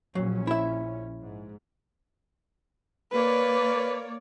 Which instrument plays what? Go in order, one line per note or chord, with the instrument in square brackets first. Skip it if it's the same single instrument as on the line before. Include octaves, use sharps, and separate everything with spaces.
[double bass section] A#1 A#2 C#4 [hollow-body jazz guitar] F#3
[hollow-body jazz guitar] E4 E5
[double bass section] G#2
[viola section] A#3 C#5 D5 [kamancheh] B4